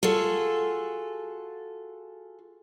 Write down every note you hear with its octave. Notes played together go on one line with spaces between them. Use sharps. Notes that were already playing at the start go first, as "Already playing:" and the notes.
F4 F#4 G#4 A4